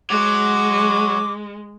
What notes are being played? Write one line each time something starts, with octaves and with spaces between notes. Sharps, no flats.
F#3 G#3 F#4 D6